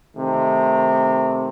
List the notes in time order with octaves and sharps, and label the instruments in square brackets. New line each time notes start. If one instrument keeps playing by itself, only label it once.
[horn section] C3 D#3 A3